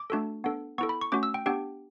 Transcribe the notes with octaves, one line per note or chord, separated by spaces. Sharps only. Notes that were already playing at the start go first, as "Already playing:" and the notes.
Already playing: D6
A3 D4 F#4 A4
B3 D4 A4
B3 E4 A4 C#6
B5
C#6
A3 C#4 F#4 D6
E6
G5
B3 D4 G4 G5